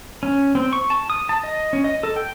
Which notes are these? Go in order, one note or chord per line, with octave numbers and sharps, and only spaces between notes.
C#4
C4
C#6
A5
D#6
A5
D#5
C#4
D#5
A4
G5